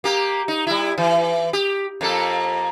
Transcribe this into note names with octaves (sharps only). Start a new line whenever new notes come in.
A#3 G4
D#4
G3 E4
E3
G4
F2 A#3 A4